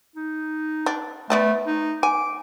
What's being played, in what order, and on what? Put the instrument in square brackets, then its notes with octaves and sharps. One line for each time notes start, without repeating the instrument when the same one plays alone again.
[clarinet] D#4
[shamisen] D4
[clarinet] A3 [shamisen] B3 D5 A5
[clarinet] D#4
[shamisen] G#5 [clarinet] D6